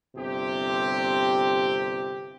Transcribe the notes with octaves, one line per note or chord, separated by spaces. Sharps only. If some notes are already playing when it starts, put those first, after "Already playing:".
G1 C3 C4 G4